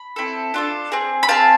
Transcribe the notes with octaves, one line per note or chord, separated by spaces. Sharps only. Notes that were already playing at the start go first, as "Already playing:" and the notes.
Already playing: B5
C4 E4 A4
D4 F4 A4
C4 G#4
B5
C4 G#4 F5 A5